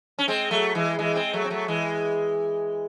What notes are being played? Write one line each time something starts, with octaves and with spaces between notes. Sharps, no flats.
C#4
G#3 C4
F#3 A3
E3 G#3
E3 G#3
G#3 C4
F#3 A3
C4
F#3 A3
E3 G#3